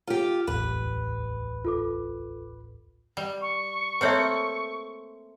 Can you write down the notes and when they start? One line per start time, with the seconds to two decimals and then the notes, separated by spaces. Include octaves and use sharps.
0.07 F4 G4
0.47 D1 A1 E2 B4
1.65 F4 A4 D6
3.17 G3
3.42 C#6
4.01 A3 A#3 C4 B4 C#5 E5